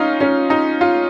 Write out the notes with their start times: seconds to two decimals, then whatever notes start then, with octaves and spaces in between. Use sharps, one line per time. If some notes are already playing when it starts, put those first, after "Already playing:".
Already playing: C#4 D#4 F4
0.21 C#4
0.50 D#4
0.81 F4